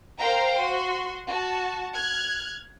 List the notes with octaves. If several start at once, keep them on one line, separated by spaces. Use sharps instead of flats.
A#4 C5 F5 G5 A#5
F#4 C6
F#4 A5
F6 F#6 G#6